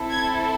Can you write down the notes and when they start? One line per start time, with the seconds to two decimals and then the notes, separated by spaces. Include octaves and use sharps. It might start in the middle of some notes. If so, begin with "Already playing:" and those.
Already playing: C4 E4 A4
0.11 G#6